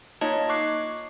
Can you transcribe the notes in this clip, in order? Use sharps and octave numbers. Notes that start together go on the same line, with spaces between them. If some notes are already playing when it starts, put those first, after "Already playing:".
A#3 D#4 F4 C#5 D#5 A5
C#6 D6 F#6 C7